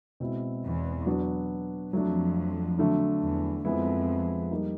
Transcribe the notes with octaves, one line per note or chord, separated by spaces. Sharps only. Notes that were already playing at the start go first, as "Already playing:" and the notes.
B2 G#3 C4 E4
E2
F#3 B3 D4 F#4
F2 F#3 A3 D4
D3 F#3 A3 D4
E2
F2 F3 G#3 B3 E4
G3 A#3 D#4